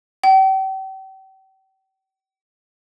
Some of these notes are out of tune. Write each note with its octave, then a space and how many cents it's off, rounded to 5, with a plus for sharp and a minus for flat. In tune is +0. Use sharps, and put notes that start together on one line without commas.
G5 -40